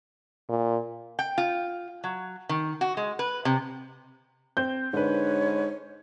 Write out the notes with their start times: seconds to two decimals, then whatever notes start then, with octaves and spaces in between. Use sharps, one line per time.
0.49 A#2
1.19 G5
1.38 F4
2.04 F#3
2.49 D#3
2.81 F#4
2.97 G#3
3.19 B4
3.45 C3
4.57 C4 G6
4.93 G#2 D3 B4 C#5